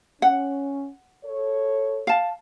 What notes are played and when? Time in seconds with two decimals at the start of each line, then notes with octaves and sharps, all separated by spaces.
0.22 C#4 F#5
1.24 A4 C#5
2.07 F5 A5